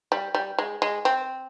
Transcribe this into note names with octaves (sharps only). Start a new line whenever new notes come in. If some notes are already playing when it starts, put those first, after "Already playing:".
G3
G3
G#3
G#3
C4